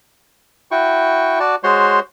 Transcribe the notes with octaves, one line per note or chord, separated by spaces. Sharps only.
E4 F#4 G5 C#6
F#4 D5 A5
G#3 F#4 C5 C#5 C6